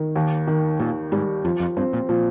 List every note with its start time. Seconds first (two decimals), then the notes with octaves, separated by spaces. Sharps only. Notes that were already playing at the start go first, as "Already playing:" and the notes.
Already playing: D#3
0.16 D#2
0.47 D#3
0.80 D#2 A#2
1.12 G#2 G3
1.44 F2 F3
1.60 F2
1.77 G2 C4
1.93 A#2
2.09 A#2 F3